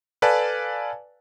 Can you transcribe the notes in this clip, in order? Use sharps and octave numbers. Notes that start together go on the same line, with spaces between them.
A4 B4 D5 F5 G#5 A5